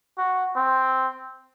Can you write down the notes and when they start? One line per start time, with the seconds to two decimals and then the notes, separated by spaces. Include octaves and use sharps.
0.17 F#4
0.56 C4